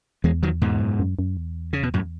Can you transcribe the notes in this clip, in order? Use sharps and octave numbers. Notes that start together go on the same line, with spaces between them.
E2 E3 G#3
D#3 F#3
G#2 B2
F#2
F#2
F#2
E2
C#3
B2
F#2 A2